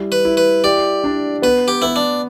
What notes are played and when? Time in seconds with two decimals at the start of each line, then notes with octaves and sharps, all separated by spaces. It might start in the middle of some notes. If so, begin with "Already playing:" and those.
Already playing: G3 E4
0.12 B4
0.25 E4
0.37 B4
0.64 G4 D5
1.04 D4
1.42 B3 B4
1.68 G4
1.82 B3 E4
1.96 D4